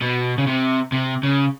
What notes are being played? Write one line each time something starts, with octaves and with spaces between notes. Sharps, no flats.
B2
C#3
C3
C3
C#3